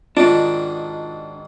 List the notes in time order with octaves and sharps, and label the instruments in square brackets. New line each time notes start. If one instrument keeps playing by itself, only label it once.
[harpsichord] G#2 B2 D#3 [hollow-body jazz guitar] D4 [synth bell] F4